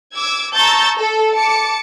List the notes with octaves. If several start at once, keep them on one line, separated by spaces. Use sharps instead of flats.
D6 E6 G#6
A5 A#5 C#6 E6 G6 A6
A4
A5 D6 C#7